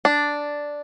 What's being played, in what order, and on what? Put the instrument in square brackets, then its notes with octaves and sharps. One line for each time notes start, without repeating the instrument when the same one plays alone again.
[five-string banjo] D4